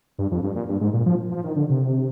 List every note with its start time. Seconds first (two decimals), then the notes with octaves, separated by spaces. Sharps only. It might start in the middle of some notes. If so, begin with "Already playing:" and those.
0.18 G2
0.31 F2
0.43 G2
0.56 A#2
0.69 G2
0.81 G#2
0.93 A#2
1.06 F3
1.32 F3
1.44 D#3
1.56 D3
1.69 C3